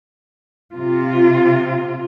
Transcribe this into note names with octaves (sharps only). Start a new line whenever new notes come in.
C3 F4